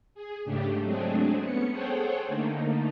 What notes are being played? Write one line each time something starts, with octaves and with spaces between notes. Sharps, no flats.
G#4
G#2 C#3 A3 D4 G4
F#3 G#3 A3 C4 D4 G#4
B3 C#4 C#7
G#4 A4 C5 C#5 F#5 G5
D3 A3 A#3 D#4